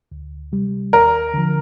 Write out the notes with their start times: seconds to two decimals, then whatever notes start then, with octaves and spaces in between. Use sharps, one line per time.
0.12 D2
0.52 C3 G3
0.93 D#2 A#4
1.34 D3 F3